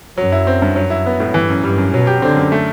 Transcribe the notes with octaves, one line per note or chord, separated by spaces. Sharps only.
F#2 F#3
E4
C4
G2
F#3
E4
B3
A2
G2 E3
F#2
G2 G3
F#2
B2 F#3
G4
D3 C4
F#2
A3